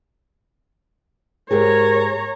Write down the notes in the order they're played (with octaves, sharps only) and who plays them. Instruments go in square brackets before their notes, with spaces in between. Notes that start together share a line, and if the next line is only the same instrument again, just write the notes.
[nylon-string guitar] G#2 G4 G#4 [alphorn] A#4 [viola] C#5 A#5